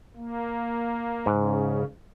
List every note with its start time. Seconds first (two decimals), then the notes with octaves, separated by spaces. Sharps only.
0.16 A#3
1.26 G#2 C#3